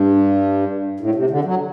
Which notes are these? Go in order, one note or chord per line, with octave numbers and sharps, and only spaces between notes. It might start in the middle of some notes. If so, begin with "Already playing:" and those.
Already playing: G2
A2
C3
D3
F#3